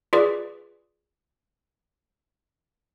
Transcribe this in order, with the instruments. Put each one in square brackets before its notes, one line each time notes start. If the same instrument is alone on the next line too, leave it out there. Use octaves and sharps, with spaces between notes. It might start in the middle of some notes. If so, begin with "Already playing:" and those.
[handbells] F4 G#4 B4 D5